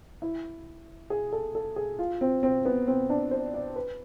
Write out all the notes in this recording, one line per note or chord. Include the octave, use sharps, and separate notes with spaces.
E4
G#4
A4
A4
G#4
F4
C4
C4
B3
C4
D4
C5
D5
B4